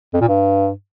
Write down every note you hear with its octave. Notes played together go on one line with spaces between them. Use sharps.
F2
A#2
G2